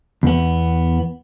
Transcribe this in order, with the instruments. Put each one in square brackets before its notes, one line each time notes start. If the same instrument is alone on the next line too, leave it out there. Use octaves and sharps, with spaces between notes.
[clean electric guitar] E2 B3